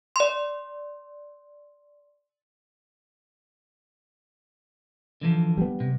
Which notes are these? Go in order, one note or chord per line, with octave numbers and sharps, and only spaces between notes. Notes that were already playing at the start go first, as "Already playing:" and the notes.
D5 C6
D3 E3 F3
G3 B3
C3